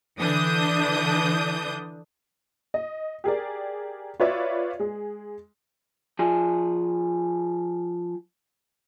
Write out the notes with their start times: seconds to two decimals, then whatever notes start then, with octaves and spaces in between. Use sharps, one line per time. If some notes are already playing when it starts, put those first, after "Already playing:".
0.18 D3 E3 D4 D#6 G6
2.74 D#5
3.24 G4 G#4 A#4 D5
4.20 F4 F#4 B4 C#5 D5 E5
4.79 G#3 G#4
6.19 F3 G#4